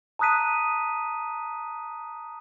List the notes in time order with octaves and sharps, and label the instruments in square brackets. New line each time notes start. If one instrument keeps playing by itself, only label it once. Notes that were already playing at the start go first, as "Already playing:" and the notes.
[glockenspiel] A5 A#5 D#6 F#6 B6 D#7